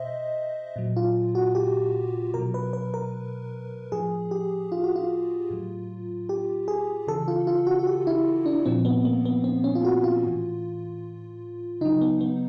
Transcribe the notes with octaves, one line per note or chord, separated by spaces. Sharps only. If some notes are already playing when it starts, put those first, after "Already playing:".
Already playing: B2 C5 D#5 E5
A#2 F#3
F4
F#4
G4
B2 F#3 A#4
B4
B4
A#4
A2 F3 G#4
G4
F4
F#4
F4
A2 F#3
G4
G#4
C#3 E3 A4
F4
F4
F#4
F#4
G4
E4
D4
A#2 F3 C4
B3
A#3
B3
C4
C#4
F4
F#4
F4
A2 E3
C#3 F#3 D#4
B3
B3